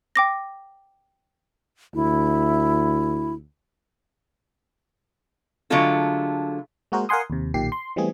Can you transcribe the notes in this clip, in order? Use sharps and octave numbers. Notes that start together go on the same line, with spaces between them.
G5 D6 A#6
D2 E4
D3 F#3 G#3 A3 F4 A4
G#3 A#3 F#4 G#4 A#4 C5
A#4 F5 F#5 G#5 C6 D#6
D#2 C3
B1 A#2 D#3 G4 C7
C6
E3 G3 A3 B3 C4 G#4